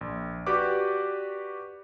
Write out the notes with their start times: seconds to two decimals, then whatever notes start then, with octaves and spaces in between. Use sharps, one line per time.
0.01 A#1
0.47 F#4 G4 B4 D5 D6